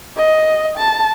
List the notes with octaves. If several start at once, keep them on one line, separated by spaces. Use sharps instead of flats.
D#5
A5